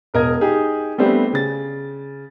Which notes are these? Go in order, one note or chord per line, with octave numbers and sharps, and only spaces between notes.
E1 A#4 D#5 G#6
D#4 G4 G#4
G3 A3 B3 C4 D4 G4
C#3 A6